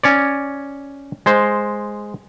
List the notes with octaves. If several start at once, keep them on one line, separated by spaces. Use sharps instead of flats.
C#4 C#5 D5
G#3 C5